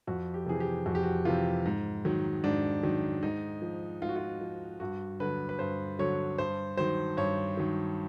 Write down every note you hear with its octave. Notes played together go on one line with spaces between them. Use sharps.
F2 F#4
G4
C3 E3 G#4
G4
F2 F#4
G4
F#4
C3 E3 F4
G#2
D#3 F#3
G#2 D4
D#3 F#3
G#2 D#4
F3
G#2 F4
F#4
F4
F3
G2 F#4
D3 F#3 B4
B4
G2 C5
D3 F#3 C#5
G2 C5
D#3 F#3 C5
G2 C#5
D#3 F#3